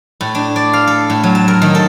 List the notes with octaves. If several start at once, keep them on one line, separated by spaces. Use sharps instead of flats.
A2
D4
D5
F5
A4
A2
F#3
A5
A#4
D#3
A4